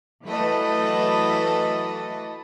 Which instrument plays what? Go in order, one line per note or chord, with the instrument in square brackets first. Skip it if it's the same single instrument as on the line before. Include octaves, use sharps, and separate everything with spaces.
[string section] E3 F#3 A3 A4 B4 D#5